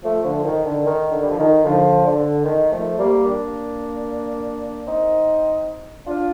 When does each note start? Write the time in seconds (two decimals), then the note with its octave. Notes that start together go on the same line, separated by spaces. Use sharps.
0.04 F3 A3
0.24 D3 F3
0.44 D#3
0.64 D3
0.85 D#3
1.12 D3
1.22 G3
1.30 F3
1.38 D#3
1.64 D3 F3
2.05 D3
2.45 D#3
2.71 F3 A3
2.98 G3 A#3
3.25 A#3 D4
4.86 C4 D#4
6.07 D4 F4